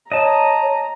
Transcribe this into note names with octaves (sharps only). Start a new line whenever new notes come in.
C#5 D#5 A5 A#5